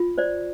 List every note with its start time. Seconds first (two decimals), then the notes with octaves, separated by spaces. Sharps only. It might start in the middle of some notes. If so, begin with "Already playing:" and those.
Already playing: F4
0.18 C5 D5